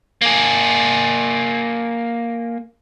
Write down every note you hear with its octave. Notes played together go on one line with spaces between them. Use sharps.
A#3 G#4